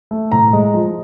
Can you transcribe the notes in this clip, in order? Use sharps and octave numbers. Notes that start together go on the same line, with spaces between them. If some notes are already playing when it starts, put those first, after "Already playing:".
A3
A2 A#5
G#3
F3